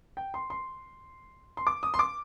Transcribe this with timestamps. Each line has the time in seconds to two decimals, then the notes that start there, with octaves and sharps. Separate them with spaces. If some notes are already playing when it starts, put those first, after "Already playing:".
0.17 G5
0.34 C6
0.50 C6
1.57 C6
1.67 D6
1.83 D#6
1.94 C6
1.99 D6